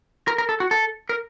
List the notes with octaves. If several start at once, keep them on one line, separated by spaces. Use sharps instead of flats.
A#4
A#4
A4
F#4
A4
A#4